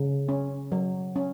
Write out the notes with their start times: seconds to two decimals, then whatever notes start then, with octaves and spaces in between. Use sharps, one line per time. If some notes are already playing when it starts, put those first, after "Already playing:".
Already playing: C#3
0.29 C#4
0.72 F#3
1.16 C#4